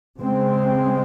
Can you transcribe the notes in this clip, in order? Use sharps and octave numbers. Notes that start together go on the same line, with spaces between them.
C#3 G#3 C4